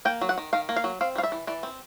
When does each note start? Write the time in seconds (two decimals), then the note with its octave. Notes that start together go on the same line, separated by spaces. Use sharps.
0.05 A#3 G5
0.21 F#3
0.29 F#5
0.38 D#3
0.53 D#3 F5
0.69 A#3
0.76 F5
0.84 F#3
1.01 C4 F5
1.16 G3 F5
1.23 E5
1.32 E3
1.47 E3 D5
1.63 C4